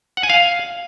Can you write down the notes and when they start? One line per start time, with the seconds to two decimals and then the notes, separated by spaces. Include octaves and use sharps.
0.17 F#5
0.23 G#5
0.30 F5